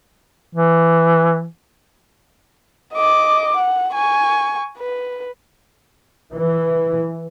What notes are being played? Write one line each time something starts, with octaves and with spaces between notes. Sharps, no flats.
E3
D#5 D6
F#5
G#5 C#6
B4
E3